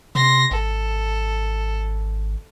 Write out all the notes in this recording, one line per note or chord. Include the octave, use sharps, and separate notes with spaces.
C3 C6 A#6
G#1 A4